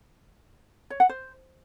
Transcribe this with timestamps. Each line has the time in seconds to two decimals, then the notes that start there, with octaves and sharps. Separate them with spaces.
0.90 C#5
1.00 F#5
1.09 C5